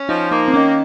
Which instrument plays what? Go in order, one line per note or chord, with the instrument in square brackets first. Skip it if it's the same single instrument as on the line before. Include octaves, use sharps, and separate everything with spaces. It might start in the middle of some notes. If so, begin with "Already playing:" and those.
Already playing: [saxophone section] C#4
[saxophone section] F3 [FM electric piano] D#4
[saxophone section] A#3 [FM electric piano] D#4
[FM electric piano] C4
[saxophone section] D#3 [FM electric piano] C#4